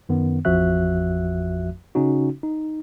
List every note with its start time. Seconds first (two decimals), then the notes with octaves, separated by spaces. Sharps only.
0.09 F#2 D#3 B3
0.45 A1 F2 F3 F#4 E5 F#6
1.95 C#3 C#4 D#4 F#4
2.43 D#4